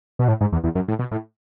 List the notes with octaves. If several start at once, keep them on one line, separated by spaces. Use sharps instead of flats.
B2
A2
G#2
E2
E2
F#2
A2
B2
A2